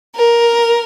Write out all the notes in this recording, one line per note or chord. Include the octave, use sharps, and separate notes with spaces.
A#4